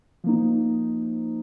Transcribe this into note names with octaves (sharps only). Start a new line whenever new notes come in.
F3 A#3 D#4